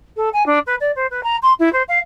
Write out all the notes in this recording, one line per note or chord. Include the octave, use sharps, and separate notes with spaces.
A4
G#5
D4
B4
D5
C5
B4
A#5
C6
E4
C5
F5